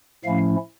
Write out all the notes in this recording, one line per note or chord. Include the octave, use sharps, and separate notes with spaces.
A2 F3 A3 C#4 E4 F5